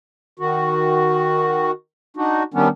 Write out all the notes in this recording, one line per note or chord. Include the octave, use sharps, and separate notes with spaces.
D#3 F#4
D4 D#4 F#4
D#3 G3 B3 C#4 D4